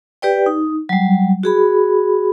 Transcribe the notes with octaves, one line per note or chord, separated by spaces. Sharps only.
G4 B4 D5 G5
D#4
F#3 G3
F#4 G#4 B5